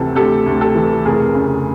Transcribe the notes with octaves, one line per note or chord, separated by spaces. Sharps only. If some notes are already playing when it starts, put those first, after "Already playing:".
Already playing: D2 C3 E3 A4
D2 G4 A4
D2
G4 A4
E3
F1 G#4 A#4
C#3